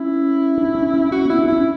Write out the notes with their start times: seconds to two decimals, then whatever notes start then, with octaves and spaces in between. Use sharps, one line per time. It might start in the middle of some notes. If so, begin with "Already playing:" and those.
Already playing: C#4 E4
0.58 D4
0.75 C#4
0.94 C#4
1.11 C#4 F#4
1.25 B3 E4
1.39 D4
1.48 C#4 E4